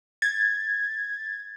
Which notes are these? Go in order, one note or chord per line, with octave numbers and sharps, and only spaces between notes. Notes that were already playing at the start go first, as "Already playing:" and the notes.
G#6 A6